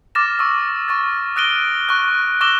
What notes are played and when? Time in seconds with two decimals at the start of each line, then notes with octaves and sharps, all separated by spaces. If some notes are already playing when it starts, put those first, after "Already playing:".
0.15 D6 F6 A6 A#6 E7
0.39 C#6 E6
0.88 C#6 F6 A6
1.36 D#6 F#6 A#6 D7 D#7 G7
1.89 C#6 F#6
2.41 C#6 D6 E6 A#6 E7 G7